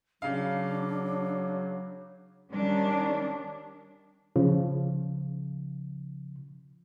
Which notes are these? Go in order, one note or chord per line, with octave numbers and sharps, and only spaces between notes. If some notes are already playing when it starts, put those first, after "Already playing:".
C#3 F#3 D4 F5
D#3 G3 C#4 D4
C#3 F3